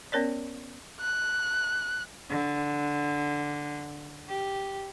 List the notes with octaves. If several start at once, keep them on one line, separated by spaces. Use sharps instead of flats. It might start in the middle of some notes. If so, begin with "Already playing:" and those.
B3 C#4 A#4 C#5 D5
F#6
D3
G4